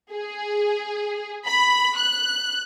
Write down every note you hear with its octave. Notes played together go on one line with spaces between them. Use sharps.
G#4
B5
F#6